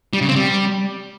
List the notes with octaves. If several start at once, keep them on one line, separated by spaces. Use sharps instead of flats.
G3
C#3
C4
G3